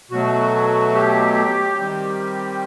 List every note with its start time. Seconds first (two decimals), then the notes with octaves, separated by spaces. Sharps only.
0.11 B2 F#3 A3 F#4
0.94 G4
1.77 D#3 G3 C4